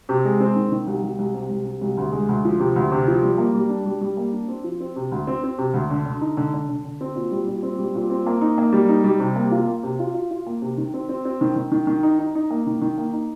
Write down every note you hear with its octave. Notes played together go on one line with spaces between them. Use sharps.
C3
G#3
C4
D#3
D#3
C2
C2
C2
C3
C2
C3
C2
D2
G#3
D2
F3
C3
D2
C3
F3
G3
A#3
G3
D4
G3
G3
A#3
D4
C4
F3
C4
C3
D2
C4
C4
C3
D2
D3
D3
D#4
D3
D3
D3
D3
C4
A#2
G3
A#2
C4
G3
A#2
C4
A#3
D#4
A#3
G3
D#4
G3
C3
A#3
F4
A#3
C3
F4
F4
F4
A#3
C3
D#3
C4
C4
C4
D#3
D#3
D#3
D#3
D#4
D#4
D#4
A#3
D#3
D#3
A#3
D#4